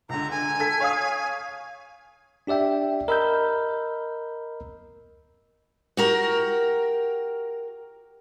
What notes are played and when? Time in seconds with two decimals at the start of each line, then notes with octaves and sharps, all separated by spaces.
0.09 C#2 D3 A#5
0.31 G#5
0.60 A4 B6
0.80 C#5 F5 D#6
2.47 D4 G4 D5 E5 G5
3.08 A#4 D#5 B5 E6 F6 G6
5.97 F#4 G4 A#4